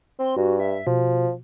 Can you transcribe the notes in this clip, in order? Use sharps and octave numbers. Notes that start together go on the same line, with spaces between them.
C4 C6
G2 F#4
E5
B2 F3